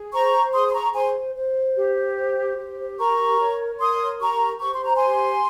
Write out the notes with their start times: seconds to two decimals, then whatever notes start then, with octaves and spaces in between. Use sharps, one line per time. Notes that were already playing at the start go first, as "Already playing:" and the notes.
Already playing: G#4
0.12 C5 A#5 C#6
0.53 G#4 C6 D#6
0.69 C6
0.74 A#5 C#6
0.94 C5 G#5 C6
1.35 C5
1.76 G4
2.16 C5
2.57 G4
2.98 A#4 A#5 C#6
3.40 C#5
3.80 A#4 C6 D#6
4.20 G4 A#5 C#6
4.61 C5 C#6
4.73 C6
4.84 A#5
4.96 G#5 C6
5.03 G4